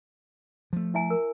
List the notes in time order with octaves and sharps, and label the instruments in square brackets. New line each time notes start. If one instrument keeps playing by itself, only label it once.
[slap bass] F3 A3
[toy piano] E4 E5 G#5
A#4